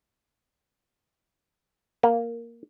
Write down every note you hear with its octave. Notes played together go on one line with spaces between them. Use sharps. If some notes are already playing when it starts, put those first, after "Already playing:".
A#3